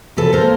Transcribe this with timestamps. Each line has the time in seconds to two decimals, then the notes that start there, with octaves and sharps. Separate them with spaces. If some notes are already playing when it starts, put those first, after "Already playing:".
0.17 C3 A4 B4
0.33 A#4 C5
0.41 A#3